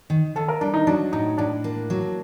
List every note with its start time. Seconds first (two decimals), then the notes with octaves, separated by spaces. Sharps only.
0.10 D#3
0.36 D#3 A4
0.48 A#4
0.61 G3 D4
0.74 D#4
0.87 F#3 D4
1.13 A2 D#4
1.38 A2 D4
1.64 A#3
1.90 F#3